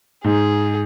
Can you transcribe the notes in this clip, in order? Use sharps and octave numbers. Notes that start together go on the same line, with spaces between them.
G#2 G#4